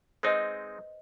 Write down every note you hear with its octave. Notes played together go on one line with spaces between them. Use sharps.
G#3 C4 D#4 B4 C5 D#5